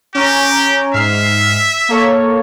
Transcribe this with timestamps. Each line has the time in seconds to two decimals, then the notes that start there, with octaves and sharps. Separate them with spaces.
0.15 C#4 G4 A#5
0.94 G#2 E5 F6 C7
1.89 A#3 A4 C#5